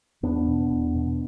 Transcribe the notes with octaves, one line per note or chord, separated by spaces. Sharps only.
E2 B3 D4
B2
E2
B2